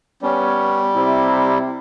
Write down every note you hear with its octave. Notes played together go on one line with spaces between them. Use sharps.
G3 B3 C#4
C3 E4